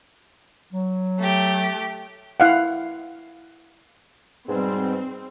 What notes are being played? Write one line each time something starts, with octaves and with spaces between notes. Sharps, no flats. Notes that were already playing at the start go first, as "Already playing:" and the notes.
F#3
A3 G4
E4 F5 F#5
G#2 B2 G3 C4